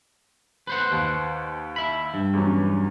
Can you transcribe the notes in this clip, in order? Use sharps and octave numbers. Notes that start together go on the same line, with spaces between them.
B4 C5 F#5
D#2
E5 B5
G2
E2 F#3 C#4